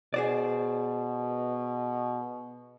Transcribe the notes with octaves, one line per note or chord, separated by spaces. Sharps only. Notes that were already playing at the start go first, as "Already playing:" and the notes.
B2 G#4 C5 D5